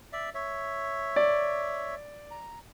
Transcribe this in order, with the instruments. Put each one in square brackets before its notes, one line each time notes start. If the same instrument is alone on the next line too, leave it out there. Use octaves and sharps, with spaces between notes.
[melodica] D5 E5
C#5 E5
[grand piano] D5
[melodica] A#5